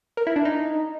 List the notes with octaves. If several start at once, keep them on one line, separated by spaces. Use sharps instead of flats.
A#4
E4
D4
D#4